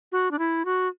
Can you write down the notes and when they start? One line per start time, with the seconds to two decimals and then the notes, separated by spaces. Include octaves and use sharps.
0.12 F#4
0.31 D4
0.39 E4
0.65 F#4